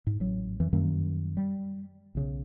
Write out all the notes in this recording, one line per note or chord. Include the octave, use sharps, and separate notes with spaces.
G#2
A1 F#3
F2 E3
F#2 D#3 G3 A#3
G3
B1 C#3